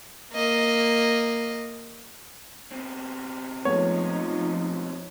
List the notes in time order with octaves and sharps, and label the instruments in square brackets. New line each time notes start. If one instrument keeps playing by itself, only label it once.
[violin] A#3 D#5
[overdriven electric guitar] B2 C4
[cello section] F3 D#4 [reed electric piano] G#3 A3 B3 [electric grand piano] C#5